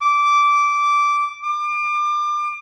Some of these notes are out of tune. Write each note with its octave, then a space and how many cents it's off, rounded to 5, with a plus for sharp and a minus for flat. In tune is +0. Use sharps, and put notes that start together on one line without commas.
D6 -10
D6 +30